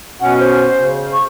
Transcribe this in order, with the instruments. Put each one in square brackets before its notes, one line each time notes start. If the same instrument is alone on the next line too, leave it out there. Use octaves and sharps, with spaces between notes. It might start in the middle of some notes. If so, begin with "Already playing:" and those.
[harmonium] B2 C#4 [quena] F#5
[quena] C5
[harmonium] C#3
[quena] C#6